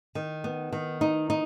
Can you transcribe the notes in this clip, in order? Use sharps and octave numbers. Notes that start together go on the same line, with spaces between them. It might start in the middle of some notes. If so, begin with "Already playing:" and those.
D#3
B3
D#3
D#4
D#4